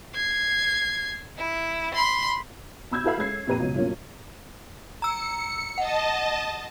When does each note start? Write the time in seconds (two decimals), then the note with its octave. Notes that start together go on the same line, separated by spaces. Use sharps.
0.15 G#6 C7
1.37 E4
1.95 B5 C6
2.91 B2 B5 E6 G6 G#6
3.04 E4 F#4 A4 B4 F5 B5
3.18 G#3 C#4 G#6 C7
3.47 F2 A#2 G4 B4 A#5 D#7
3.60 C#2 B2 F#3
3.74 G2 B2 F#3 A#3 C#4 F4
5.02 A#5 E6 C#7
5.78 D#5 F#5 A5